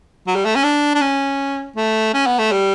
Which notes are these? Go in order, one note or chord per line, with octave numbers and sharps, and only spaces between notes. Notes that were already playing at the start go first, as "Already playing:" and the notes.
F#3
G3
A3
C#4
D4
D4
C#4
A3
C#4
B3
A3
G3